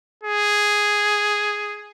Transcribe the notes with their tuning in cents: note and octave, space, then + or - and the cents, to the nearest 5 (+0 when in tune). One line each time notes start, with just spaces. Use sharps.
G#4 +0